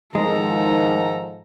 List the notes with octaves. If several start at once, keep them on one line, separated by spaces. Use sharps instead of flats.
G#2 D#3 F3 G#3 A4 A#5